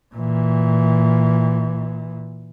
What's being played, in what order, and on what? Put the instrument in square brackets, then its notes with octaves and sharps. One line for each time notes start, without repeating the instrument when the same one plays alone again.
[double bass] A#2 E3